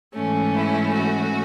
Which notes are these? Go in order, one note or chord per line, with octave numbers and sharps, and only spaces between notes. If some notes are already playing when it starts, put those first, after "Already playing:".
G#2 E3 A3 C#4
E4
F#4